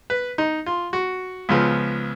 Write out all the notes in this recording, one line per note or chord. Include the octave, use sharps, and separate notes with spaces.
B4
D#4
F4
F#4
C#2 C#3 F3 B3